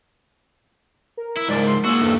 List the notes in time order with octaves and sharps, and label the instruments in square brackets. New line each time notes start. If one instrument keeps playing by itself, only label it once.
[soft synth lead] A#4
[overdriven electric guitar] E4
[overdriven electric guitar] C#2 G#2 [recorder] D5
[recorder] C6
[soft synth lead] A#3 [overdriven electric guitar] F#4 G#4 [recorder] E6
[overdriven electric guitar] E2 G2 [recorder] A4